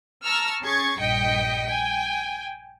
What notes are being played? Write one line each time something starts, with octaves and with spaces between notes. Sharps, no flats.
A5 A#5 C#6 E6 F6
C#4 G#4 C#6 G#6 A6 C7
A#1 G2 D#5 G5 B6 C#7
G5 G#5